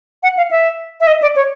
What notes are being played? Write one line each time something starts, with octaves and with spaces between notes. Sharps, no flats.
F#5
F5
E5
E5
D#5
D5
C#5